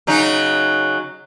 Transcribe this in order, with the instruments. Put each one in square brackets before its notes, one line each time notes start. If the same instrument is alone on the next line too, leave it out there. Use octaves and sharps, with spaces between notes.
[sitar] C#3 F#3 D#4